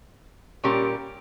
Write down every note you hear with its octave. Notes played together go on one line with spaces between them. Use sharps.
A#2 G3 C#4 G4 A#4